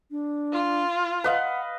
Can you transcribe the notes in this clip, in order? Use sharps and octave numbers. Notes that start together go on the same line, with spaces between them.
D4
F4
B4 D#5 F5 F#5